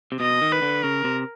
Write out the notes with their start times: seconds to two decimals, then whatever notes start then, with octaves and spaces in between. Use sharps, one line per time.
0.12 C3
0.20 B2 D#5
0.42 D#3
0.52 B4
0.62 D3
0.83 C#3 A#4
1.04 C3